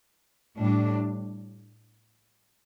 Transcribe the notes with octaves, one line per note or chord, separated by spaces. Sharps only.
A2 G3 D4